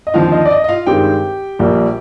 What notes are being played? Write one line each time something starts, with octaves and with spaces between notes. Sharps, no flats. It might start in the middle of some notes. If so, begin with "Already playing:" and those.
D#5
D#2 D3 F3 C4 F4 F5
D#5
D5
D#5
D#5
F4 F5
G2 D#3 G#3 C4 G4 G5
A#1 A#2 G3 A#3